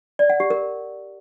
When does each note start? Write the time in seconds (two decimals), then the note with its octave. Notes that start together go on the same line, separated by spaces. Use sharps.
0.19 D5
0.30 F#5
0.40 G4
0.50 A#4